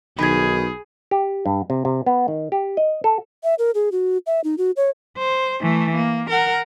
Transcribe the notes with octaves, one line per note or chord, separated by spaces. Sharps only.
B1 D#3 G#4 B5 G#6
G4
G2
C3
C3
B3
D#3
G4
D#5
A4
E5
A#4
G#4
F#4
E5
D#4
F#4
C#5
C5
E3 A3
A#3
A#4 F#5